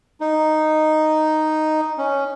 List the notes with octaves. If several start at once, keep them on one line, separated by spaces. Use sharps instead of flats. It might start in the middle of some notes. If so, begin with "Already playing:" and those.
D#4
C#4